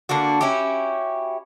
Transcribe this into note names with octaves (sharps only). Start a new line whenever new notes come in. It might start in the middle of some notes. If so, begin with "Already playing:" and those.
D3 A#3 D4 F#4
C#4 E4 F#4 G4